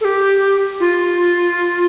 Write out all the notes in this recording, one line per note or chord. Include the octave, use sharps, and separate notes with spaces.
A4
G4
F4